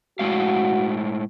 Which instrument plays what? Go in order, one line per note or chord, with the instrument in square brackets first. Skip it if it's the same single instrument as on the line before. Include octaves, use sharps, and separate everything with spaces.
[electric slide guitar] A2 G#3 F5 [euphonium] F#4